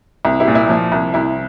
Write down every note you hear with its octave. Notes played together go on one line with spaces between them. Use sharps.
C2
E4 G4
A#2
E4
F3
C2
C2 E4